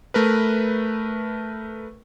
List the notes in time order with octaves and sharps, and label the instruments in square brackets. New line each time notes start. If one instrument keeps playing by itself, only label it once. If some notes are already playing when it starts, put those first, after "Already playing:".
[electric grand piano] A3 A#4 B4